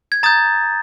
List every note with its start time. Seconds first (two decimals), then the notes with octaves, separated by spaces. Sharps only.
0.12 G#6
0.23 A#5 D#6 G6 A6